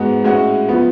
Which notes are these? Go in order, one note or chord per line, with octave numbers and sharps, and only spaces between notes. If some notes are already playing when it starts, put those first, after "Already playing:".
Already playing: G#2 G#3 B3 F#4
A2 G#3 C#4 F#4
F3 B3